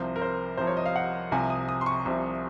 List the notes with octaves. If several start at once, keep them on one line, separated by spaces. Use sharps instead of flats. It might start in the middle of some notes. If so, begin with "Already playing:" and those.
Already playing: C2 C3 F3 C5
A#4
C5
C2 C3 F3 C5
C#5
D#5
F5
F#5
C2 C3 F3 G#5
D#6
D#6
C6
C#6
C2 C3 F3